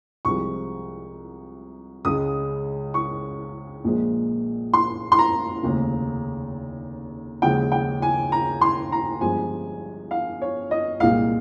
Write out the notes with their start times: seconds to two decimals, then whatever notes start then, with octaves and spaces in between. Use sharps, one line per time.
0.25 C2 C3 F3 G#3 C#6
2.05 C#2 C#3 G#3 D#6
2.94 C#6
3.84 A#1 A#2 F3 G#3
4.74 C6
5.12 C6
5.19 A#5
5.63 F1 D#2 C#3
7.42 D#2 C#3 F3 G#3 G5
7.72 G5
8.02 G#5
8.32 A#5
8.61 C6
8.92 A#5
9.21 G1 G2 F3 G#3 G#5
10.11 F5
10.42 C#5
10.71 D#5
11.00 C2 A#2 G#3 F5